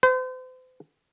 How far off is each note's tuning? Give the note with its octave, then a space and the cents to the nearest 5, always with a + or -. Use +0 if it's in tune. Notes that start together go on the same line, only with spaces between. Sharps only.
C5 -40